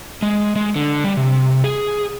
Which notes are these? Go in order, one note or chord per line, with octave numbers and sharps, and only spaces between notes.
G#3
G#3
D3
G3
C3
G#4